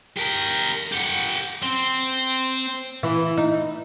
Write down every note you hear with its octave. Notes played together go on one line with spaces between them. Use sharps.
G4 A#4
G4 F#5
C4
E3
D#4